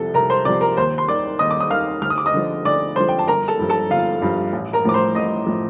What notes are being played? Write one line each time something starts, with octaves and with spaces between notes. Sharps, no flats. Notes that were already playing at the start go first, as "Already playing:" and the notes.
Already playing: C2 C3 F3 A4
C2 A#4 A#5
C5 C6
C3 F3 D5 D6
A#4 A#5
D#2 C5 C6
C6
D#3 D5 D6
D#2 D#5 D#6
D6
D#6
D#3 F5 F6
D2 F6
D#6
D6
D#5 D#6
D3 F3
D2 D5 D6
D3 F3 C5 C6
G5
A5
G1 A#4 A#5
A4 A5
G2 F3
A4 A5
G1 F4 F5
G2 F3
A1
A#4 A#5
A2 F3 D6
C5 C6
A1 D#5 D#6
A2 F3